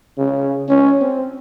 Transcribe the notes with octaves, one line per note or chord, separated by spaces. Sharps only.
C#3
C#4
C4